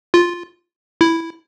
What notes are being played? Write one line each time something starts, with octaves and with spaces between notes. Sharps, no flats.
F4
E4